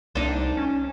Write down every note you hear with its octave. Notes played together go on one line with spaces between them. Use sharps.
C2 D4 D#4
C#4